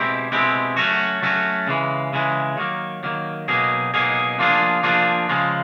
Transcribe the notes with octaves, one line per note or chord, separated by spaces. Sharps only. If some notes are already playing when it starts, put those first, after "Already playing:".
Already playing: B2 G#3 C4 E4 G4
B2 G#3 C4 E4 G4
F#3 A3 C#4 F#4
F#3 A3 C#4 F#4
C#3 E3 G#3
C#3 E3 G#3
D#3 F#3 A#3
D#3 F#3 A#3
B2 F#3 A#3 D#4 G#4
B2 F#3 A#3 D#4 G#4
F3 A#3 D4 F4 G#4
F3 A#3 D4 F4 G#4
C#3 F3 G#3